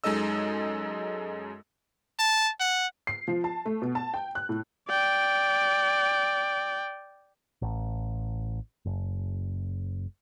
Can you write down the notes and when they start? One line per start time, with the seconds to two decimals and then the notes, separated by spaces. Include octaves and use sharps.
0.04 F#2 G#3 D#4 A4 D#5 E6
2.19 A5
2.60 F#5
3.07 C7
3.28 F3
3.44 A5
3.66 A3
3.82 B2
3.95 A5
4.14 G5
4.35 F#6
4.49 A2
4.88 D5 G5
7.62 A1
8.85 F#1